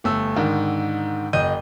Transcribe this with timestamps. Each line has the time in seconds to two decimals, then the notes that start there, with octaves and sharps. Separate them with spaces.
0.04 G1 A3 E6
0.36 G#2 D3 D#3
1.33 F#1 D#5 G6 D#7